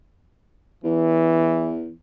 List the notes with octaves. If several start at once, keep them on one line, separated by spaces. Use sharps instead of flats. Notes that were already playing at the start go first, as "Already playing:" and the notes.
E2 E3